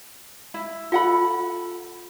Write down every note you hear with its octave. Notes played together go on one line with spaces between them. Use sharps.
E4
F4 A4 F#5 B5